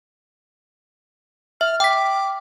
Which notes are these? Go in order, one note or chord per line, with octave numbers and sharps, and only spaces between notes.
E5 F6
G5 D6 B6